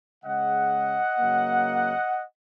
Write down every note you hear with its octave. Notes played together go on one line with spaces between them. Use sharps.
C#3 G#3 D#5 F#5
C#3 F#3 A#3